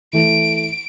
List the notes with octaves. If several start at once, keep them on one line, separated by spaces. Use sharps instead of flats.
E3 A3 D7